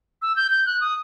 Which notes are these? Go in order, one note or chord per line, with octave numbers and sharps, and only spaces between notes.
E6
G6
G6
F#6
D#6